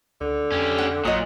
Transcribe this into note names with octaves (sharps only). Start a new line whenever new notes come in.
C#2 D3
F2 C#4 G4
F#5
A1 A#2 F#3 D#5 D#6